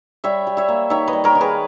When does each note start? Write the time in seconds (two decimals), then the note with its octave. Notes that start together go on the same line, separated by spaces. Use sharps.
0.24 G3 C#5 E5
0.47 G3
0.57 C#5 E5
0.68 A#3
0.90 D#3 C#5 E5
1.08 B4 D#5
1.13 G3
1.24 A#4 C#5
1.35 D#3
1.41 G#4 B4